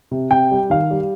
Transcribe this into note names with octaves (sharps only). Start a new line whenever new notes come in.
C3
C3 G5
G3
D#3 F5
G3